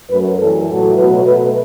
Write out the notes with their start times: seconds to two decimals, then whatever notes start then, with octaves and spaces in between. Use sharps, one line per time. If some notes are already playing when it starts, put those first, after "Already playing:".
0.10 F#2 F#3 A3 B4
0.39 F#2 E3 G3 A4
0.68 A2 F#3 A3
0.96 B2 F#3 A3 B4
1.25 B2 A3 B4